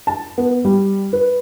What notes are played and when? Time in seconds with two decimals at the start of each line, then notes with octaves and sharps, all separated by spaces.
0.07 A5
0.38 B3
0.65 G3
1.13 B4